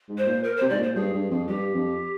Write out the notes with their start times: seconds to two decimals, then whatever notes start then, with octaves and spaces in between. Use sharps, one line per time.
0.09 G#2
0.18 C5
0.26 A#2
0.44 A#4
0.57 C3 C5
0.69 G#2 D5
0.78 A#2
0.83 C5
0.95 G2 G#4
1.13 G2
1.30 F2
1.47 G2 G4
1.74 F2